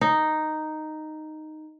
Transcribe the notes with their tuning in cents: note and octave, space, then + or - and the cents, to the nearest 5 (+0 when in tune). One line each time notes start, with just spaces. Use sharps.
D#4 -5